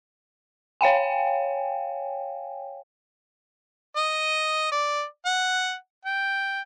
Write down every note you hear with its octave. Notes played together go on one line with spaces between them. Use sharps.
C#5 F5 G5 G#5
D#5
D5
F#5
G5